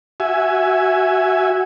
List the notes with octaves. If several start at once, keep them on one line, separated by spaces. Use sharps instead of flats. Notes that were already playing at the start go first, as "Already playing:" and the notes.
F#4 E5 G#5